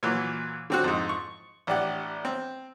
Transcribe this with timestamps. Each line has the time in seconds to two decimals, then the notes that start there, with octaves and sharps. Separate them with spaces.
0.03 A#2 E3 F#3
0.70 D3 C4 F#4
0.84 F2 G#2
1.09 C#6
1.67 A1 D4 G4 F#5
2.25 C4